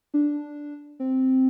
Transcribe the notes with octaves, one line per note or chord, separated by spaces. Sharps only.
D4
C4